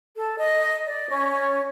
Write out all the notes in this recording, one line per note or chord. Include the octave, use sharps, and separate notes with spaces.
A4
D#5
D5
C#4